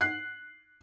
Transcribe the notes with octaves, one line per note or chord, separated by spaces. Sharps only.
F#6 C7